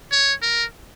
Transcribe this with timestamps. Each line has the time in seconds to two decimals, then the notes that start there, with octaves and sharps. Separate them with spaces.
0.12 C#5
0.42 A#4